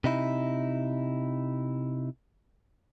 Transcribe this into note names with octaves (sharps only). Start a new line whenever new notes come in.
C3 D#4 E4